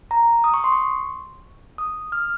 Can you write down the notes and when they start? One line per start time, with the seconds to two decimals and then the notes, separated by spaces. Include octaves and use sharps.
0.11 A#5
0.44 D#6
0.54 C#6
0.64 C6
0.72 C#6
1.78 D#6
2.12 F6